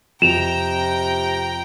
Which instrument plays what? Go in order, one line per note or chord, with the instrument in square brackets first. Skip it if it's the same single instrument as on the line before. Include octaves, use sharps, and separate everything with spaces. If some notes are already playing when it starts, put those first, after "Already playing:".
[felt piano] F2 [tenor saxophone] C3 [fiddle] G5 A#5 [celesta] E7 F7